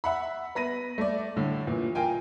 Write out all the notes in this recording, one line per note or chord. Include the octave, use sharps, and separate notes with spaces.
E5 F#5 B5
B3 B5 A#6 D#7
A3 D5
A2 D3
A#2 E3
F4 A#4 G5 G#5